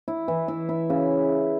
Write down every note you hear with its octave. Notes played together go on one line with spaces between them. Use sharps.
E4
E3
E4
E4
C#3